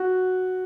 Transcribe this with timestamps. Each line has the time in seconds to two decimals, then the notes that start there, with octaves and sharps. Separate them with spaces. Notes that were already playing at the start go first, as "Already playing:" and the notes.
Already playing: F#4